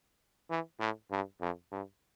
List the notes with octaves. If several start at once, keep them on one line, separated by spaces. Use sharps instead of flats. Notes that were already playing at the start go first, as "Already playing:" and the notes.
E3
A2
G2
F2
G2